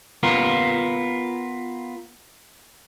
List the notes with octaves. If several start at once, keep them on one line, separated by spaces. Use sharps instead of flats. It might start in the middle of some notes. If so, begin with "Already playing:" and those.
B3 F4 A#4